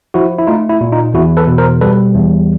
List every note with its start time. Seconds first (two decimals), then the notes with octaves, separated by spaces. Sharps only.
0.14 F3 E4 F#4
0.38 E4
0.47 A3 D#4 F4
0.69 E4
0.81 A#2
0.92 D#4 F4
1.14 E2 E4 F#4
1.37 A4 B4
1.47 B2
1.58 A#4 C5
1.81 G3 A4 B4
2.15 E2